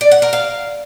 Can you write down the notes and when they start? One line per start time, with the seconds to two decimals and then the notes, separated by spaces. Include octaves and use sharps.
0.01 D5
0.11 F#5
0.22 A#4
0.33 F5